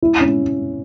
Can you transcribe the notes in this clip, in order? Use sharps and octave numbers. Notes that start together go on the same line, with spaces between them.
E4
C#4